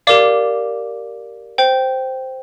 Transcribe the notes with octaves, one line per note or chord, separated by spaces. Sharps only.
G4 A#4 D5 F5 D6
C5 G5